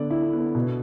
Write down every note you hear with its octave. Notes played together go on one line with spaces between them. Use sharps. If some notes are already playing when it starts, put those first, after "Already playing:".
Already playing: D3 B3 D5
E4
B3
B2